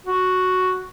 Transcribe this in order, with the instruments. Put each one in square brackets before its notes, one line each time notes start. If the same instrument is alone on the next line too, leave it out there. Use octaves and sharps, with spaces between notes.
[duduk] F#4